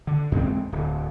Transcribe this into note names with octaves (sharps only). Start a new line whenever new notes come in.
D3
E2 G#2 G#3 C4
D1